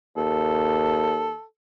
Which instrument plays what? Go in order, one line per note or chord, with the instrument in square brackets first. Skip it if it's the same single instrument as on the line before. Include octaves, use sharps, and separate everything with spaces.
[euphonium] D#2 [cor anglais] A4